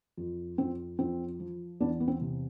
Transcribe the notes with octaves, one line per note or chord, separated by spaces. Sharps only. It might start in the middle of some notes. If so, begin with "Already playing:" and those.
F2
F2 C4
F2 C4
F3
E2 B3 D4
B3
C4
C3